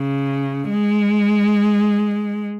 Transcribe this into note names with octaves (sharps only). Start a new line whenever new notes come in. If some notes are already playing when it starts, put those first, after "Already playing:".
Already playing: C#3
G#3